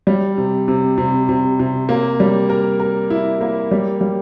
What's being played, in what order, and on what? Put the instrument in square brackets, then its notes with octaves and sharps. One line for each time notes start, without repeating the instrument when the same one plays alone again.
[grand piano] G3
C3
C3
C3
C3
C3
A#3
G3
A#4
A#4
E4
A#3
G3
G3